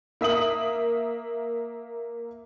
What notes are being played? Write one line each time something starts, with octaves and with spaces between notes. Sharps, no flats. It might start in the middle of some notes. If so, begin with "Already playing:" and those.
A#3 E5 D#6 F#7